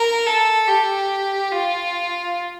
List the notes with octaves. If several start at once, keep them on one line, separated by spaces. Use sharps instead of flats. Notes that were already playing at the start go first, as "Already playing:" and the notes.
Already playing: A#4
A4
G4
F4